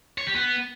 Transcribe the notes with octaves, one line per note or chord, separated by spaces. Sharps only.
C#5
G4
B3